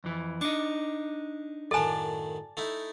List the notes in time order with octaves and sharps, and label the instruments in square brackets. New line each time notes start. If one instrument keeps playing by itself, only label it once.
[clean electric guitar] F2 E3
[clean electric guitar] D4 D#4 [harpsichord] C#6 D6
[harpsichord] F#2 A2 D#3 [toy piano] A4 G#5 [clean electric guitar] D5 A5
[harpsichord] A3 D#4 E4